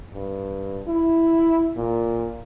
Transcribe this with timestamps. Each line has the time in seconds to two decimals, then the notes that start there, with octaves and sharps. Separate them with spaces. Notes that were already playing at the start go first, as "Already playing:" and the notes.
0.14 G2
0.88 E4
1.77 A#2